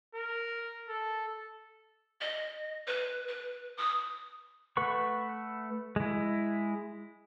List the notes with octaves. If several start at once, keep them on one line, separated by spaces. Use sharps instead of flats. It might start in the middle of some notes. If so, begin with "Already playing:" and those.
A#4
A4
D#5
B4
B4
D#6
A3 B4 F#5 B5 C#6
G#3 E4